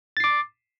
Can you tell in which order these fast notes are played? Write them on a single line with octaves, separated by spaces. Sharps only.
A6 C7 D6